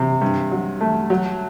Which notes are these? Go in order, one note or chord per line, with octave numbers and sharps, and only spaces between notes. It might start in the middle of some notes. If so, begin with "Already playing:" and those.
Already playing: C3
G2
F#3
A3
F#3